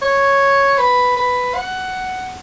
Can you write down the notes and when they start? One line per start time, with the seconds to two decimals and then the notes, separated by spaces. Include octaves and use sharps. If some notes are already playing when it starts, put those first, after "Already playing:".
0.02 C#5
0.78 B4
1.17 B4
1.55 F#5